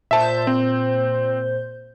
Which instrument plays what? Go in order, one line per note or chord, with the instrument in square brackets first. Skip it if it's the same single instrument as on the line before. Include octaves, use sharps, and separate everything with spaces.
[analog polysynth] A#2 C5 G6 [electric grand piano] E5 A5
[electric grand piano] C4